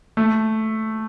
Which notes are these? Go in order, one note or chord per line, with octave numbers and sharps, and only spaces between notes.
A3